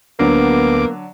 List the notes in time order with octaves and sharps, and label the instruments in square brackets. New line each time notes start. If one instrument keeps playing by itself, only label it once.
[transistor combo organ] D2 D6 [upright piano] D3 F#3 D4 [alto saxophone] A#3 [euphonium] B3